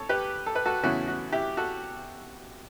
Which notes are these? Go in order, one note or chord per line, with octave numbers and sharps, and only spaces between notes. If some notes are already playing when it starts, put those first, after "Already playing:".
Already playing: A4 C#5
G4 B4
A4
B4
F#4 A4
E2 C#3 E3 A3 C#4 F#4
F#4
E4 G4
F#4 A4